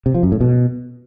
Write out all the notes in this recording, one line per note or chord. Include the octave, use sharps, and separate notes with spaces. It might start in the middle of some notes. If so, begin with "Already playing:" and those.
C3
F3
F#2
A2
B2